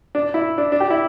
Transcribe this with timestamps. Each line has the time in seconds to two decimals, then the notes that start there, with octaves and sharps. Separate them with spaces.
0.15 D4
0.34 E4
0.58 D4
0.72 D4
0.80 G4
0.90 E4